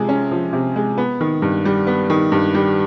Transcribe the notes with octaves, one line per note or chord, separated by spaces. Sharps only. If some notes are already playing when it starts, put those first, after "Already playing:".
Already playing: C3 F3 G#3
C#4
F3
C3
G#3
B3
D#3
G2
G3
B3
D#3
G2
G3